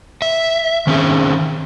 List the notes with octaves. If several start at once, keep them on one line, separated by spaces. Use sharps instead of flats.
E5
D#3 C4 C#4 G#4